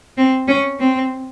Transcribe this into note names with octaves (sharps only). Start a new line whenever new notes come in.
C4
C#4
C4